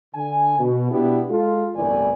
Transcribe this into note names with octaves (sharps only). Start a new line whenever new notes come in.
D3 G#5
B2
B2 B3 D4 E4 G4
G#3 F4 A4
G1 C2 A2 E3 D5 G#5